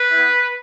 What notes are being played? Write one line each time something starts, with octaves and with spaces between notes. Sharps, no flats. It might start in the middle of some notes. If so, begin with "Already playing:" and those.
Already playing: B4
B3 E4